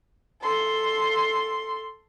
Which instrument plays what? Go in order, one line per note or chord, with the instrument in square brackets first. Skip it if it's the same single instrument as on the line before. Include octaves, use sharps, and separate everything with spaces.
[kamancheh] A4 C6